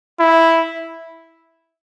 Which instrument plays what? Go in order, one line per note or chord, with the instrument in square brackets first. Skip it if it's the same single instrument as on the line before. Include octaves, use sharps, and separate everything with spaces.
[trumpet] E4